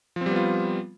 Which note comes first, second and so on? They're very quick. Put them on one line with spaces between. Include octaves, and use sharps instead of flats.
F3 C4 G3 B3 F4